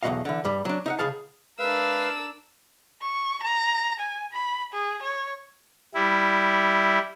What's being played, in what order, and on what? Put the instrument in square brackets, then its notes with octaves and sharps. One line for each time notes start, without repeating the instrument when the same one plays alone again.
[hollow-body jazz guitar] B1 E2 F#3 F#4 D#5 F5
D3 E3
G2 G3
F#3 D4
D#4 E5 F#5
C#2 C#3 G#4 F5 A5
[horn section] G#3 E5 F5 [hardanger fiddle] D4 A#4 [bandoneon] B4 [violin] E6
[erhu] C#6
A#5
G#5
B5
G#4
C#5
[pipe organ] G3 E4